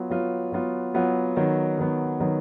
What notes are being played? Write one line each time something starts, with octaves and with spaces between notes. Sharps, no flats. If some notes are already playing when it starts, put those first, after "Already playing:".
Already playing: F#3 B3 F4
F#3 B3 F4
F#3 B3 F4
F#3 B3 F4
D#3 F#3 B3
D#3 F#3 B3
D#3 F#3 B3